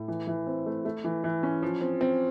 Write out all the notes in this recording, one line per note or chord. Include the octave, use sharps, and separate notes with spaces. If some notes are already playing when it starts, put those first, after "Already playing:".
Already playing: A2
E3
E3
C4
A3
A3
E3
E3
C#4
F3
C4
C4